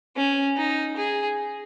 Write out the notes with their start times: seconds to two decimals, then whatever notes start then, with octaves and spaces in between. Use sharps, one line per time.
0.16 C#4
0.57 D#4
0.97 G#4